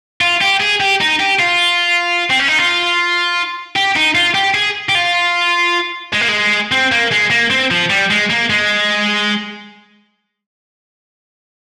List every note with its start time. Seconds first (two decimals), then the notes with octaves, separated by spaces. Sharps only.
0.21 F4
0.41 G4
0.60 G#4
0.80 G4
1.01 D#4
1.19 G4
1.39 F4
2.30 C4
2.40 C#4
2.48 D#4
2.58 F4
3.76 G4
3.96 D#4
4.15 F4
4.35 G4
4.55 G#4
4.89 G4
4.95 F4
6.13 G#3
6.21 A#3
6.28 G#3
6.72 C4
6.92 A#3
7.12 G#3
7.31 A#3
7.51 C4
7.71 F3
7.90 G3
8.10 G#3
8.30 A#3
8.50 G#3